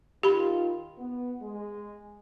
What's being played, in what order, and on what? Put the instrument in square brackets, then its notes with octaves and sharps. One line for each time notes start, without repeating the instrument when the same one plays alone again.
[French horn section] D#3 F4 [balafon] G4 B5
[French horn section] B3
G#3